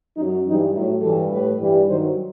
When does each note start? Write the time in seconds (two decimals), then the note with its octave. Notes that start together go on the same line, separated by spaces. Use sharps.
0.17 F#2 F#3 D#4
0.46 G2 E3 G3 D#4
0.74 A2 F#3 E4
1.02 G2 E3 G3 A4
1.30 A2 G3 B4
1.59 G2 E3 G3
1.87 G2 D#3 F#3 C5